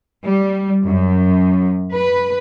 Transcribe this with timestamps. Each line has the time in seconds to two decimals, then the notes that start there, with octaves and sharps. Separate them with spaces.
0.24 G3
0.84 F#2
1.93 B4